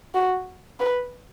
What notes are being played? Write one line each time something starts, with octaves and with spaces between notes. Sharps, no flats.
F#4
B4